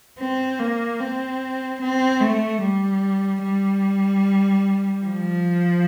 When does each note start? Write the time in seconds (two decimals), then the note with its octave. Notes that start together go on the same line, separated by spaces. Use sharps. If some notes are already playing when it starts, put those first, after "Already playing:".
0.18 C4
0.59 A#3
0.99 C4
1.81 C4
2.20 A3
2.61 G3
3.43 G3
5.05 F3